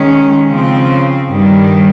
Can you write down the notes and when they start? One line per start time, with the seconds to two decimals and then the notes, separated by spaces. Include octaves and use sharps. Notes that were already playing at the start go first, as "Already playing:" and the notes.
Already playing: D#3 G#3 C#4
0.48 C#3 F3 C4
1.30 G2 D#3 G3